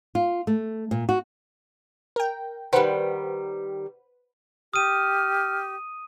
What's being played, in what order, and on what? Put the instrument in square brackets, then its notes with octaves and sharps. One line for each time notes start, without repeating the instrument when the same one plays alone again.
[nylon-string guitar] F4
A3
A#2
F#4
[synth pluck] A#4 G5
[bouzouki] D#3 G3 [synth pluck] B4 C5 F#5
[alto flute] G4 [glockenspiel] D#6 D#7 [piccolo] F6